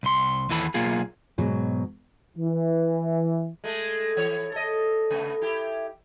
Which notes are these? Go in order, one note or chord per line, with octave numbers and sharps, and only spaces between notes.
C2 C6
D#2 E3 A4 B5
B1 A#3 F4 G#4
G#2 B2 F#3
E3
G#3 A3
E3 C#5
A4 D#5
C#3 A3 B3
E4 G4